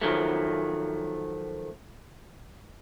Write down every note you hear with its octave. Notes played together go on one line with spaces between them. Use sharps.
D#3 F3 F#3 A3